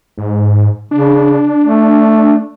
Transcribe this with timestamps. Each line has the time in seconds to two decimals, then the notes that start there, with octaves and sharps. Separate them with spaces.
0.18 G#2
0.91 C#3 D4
1.63 A3